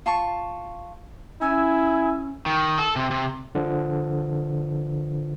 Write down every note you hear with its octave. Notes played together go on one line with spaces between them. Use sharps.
F4 A5 C#6
C#4 E4 G#5 E6
D#3
A4
C3
C3
D3 F3